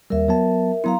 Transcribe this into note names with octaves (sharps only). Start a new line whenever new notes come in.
D#2 G3 A#4 E5
F#3 B3 A5
F#3 B3 E4 F5 A#5 C6